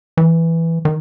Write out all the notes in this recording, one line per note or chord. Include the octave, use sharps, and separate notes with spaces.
E3
D#3